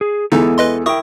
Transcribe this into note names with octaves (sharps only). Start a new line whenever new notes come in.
G#4
E2 D3 E3 G#3 B3 D#4 A4
B4 D#5 C6
E4 A#4 G5 C#6 D#6